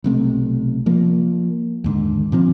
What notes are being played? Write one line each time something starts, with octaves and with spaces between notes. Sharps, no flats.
B1 C3 A3
F3 A#3
D#2 G#2 D3
A#2 F3 C4